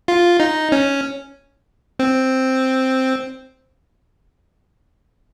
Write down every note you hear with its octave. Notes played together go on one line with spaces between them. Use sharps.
F4
D#4
C#4
C4